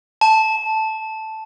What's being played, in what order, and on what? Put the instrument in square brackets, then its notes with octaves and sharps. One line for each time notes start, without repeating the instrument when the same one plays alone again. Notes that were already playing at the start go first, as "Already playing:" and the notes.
[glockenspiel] A5